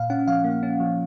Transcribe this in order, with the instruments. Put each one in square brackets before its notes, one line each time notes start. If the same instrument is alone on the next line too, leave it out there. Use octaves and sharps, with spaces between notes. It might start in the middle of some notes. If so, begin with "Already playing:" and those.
Already playing: [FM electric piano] A#2 F5
C#4 F#5
F3 F5
A#3
C#4
F3